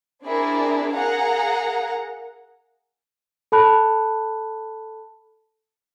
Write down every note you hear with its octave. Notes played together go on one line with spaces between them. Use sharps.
C4 D4 E4 G#4 A#4 D5
G#4 A#4 F5 F#5 A#5
A4 A5 B5 F#6